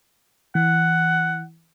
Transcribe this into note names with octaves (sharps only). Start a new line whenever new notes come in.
E3 F#5